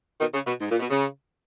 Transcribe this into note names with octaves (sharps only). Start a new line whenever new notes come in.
B2 D#3
C#3
B2
G#2
A#2
B2
C#3